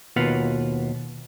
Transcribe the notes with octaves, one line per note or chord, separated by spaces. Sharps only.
D#2 B2 F4 B4 F5 F#5